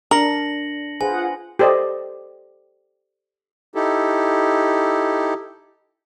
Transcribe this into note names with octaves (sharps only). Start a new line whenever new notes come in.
D4 A#4 A#6 C#7 F#7
F4 G#4 B4 C5 F#5 G#5
G4 A4 C5 D5 D#5
D#4 E4 G4 A4